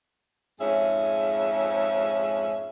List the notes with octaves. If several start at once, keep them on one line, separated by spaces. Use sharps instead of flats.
F2 G#2 C#4 G#4 E5